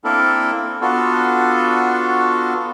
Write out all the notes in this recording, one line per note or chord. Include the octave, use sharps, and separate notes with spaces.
A#3 C4 D4 E4 A4 A#4
B3 D4 F4 F#4 A4